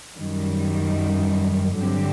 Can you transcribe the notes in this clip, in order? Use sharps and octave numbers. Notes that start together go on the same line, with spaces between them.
F#2 D#3 G3
G2 D3 F#3 C4 G4